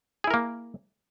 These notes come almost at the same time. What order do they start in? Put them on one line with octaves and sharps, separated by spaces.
G#4 E4 A#4 A#3